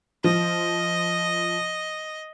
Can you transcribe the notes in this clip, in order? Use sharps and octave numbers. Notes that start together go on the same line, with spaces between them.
F3 D#5